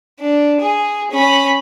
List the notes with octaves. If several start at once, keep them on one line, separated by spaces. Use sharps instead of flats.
D4
G#4
C#4 B5